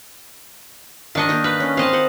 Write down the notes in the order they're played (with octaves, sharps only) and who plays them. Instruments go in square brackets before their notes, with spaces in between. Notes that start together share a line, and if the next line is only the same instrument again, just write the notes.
[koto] D#3 D4 D#5 [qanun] F5 C#6
[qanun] A#3 D#4
[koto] B4 [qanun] F5
[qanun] C#4
[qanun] C4 A5 [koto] D#5 F5
[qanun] C5 F#5